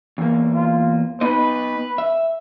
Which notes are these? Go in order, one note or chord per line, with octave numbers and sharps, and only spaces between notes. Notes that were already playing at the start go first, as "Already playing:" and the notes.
E2 A#3
F4
B3 D#4 B4 D#5
E5